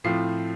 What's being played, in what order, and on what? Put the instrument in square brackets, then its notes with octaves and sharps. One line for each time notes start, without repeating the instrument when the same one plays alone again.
[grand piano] A2 F3 C4 F4 C7